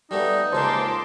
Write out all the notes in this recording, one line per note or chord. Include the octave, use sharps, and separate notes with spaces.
G3 A3 B3 D#4
C#2 C#3 A#3 C5 A5 C6 D6